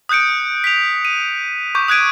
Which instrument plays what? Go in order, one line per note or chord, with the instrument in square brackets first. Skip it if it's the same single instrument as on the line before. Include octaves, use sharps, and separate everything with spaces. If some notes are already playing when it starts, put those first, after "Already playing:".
[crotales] D#6 F#6 G6 C#7 D7
B6 F7
D#7
C#6 D6 G6
D#6 F#6 G#6 D7 D#7